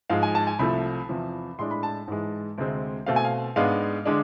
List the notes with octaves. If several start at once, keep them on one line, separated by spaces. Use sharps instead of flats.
G#2 F3 G#3 F5
G#5
A5
G#5
C2 C3 F3 A3 B5
E2 C3 F3
A2 G#3 D4 C6
B5
A5
G#2 E3 G#3
D2 C3 G#3 C4
B2 A3 C4 F5
G#5
F5
G#2 G#3 B3 D4 F5
D3 G#3 D4